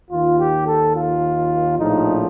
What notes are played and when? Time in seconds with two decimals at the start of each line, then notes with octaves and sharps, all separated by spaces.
0.11 D#2 D#3 F4
0.39 G4
0.67 A4
0.95 F4
1.79 A#1 A2 F3 D#4